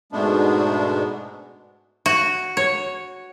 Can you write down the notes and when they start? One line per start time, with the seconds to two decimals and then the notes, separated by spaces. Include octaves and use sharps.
0.12 G#2 B2 G#3 A3 B3 D4
2.06 F#4
2.57 C#5